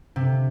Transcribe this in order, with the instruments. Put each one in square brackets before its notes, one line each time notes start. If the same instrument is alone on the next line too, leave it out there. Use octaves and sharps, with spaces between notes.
[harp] C3